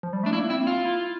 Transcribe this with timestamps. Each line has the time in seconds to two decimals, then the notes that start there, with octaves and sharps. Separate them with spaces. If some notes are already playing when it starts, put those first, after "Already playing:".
0.03 F3
0.13 G3
0.23 A3 D4
0.33 A#3 E4
0.50 C4 E4
0.67 F4
0.85 E4